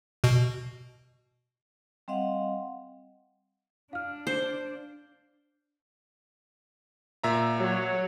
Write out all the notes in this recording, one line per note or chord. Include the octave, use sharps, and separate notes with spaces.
B2
G3 C4 D#5 F5 F#5
D4 F5 F6
C5
A#2 E5 A#5
F#3 C#5